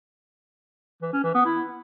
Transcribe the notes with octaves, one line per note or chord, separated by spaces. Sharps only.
E3
C#4
E3
B3
E4